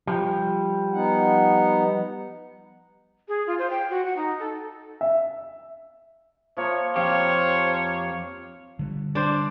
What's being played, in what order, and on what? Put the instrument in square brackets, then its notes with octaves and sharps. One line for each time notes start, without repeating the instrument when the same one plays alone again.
[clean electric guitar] F3 G3
[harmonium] B3 D#4 F#5
[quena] G#4
F4
C5
G5
F#4
F#5
D#4
A4
[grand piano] E5
[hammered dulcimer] F3 A#3 [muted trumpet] C#5
[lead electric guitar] F2 G4 [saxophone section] C5 F5 [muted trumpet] C#5
[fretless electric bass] D3 G3
[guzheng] D4 [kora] C5 D5